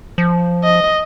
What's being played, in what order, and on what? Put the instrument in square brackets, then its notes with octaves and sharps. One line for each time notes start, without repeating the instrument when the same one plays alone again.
[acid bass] F3
[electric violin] D#5